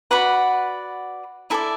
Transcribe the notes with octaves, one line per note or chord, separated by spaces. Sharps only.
F#4 B4 D5 F#5 B5
E4 A4 D5 E5 A5